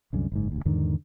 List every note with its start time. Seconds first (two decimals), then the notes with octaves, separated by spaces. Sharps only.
0.13 C2 F#2 D3
0.32 F#1 G#2
0.52 D#1 D2
0.65 E2 G#2 D3 D#3